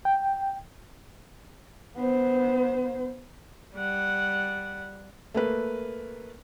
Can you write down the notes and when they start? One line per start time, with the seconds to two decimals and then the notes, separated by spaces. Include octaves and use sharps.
0.05 G5
1.96 B3 C5
3.76 G3 F#5
5.34 A3 A#3 B4